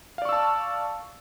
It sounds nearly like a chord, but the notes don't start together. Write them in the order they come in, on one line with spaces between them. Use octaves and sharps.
F5 D5 C#6 E6 A5